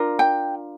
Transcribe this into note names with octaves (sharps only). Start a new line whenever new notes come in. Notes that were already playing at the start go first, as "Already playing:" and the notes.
Already playing: D4 F4 A#4
G5